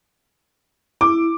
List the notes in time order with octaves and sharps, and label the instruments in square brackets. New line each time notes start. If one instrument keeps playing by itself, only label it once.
[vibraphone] E4 [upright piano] D6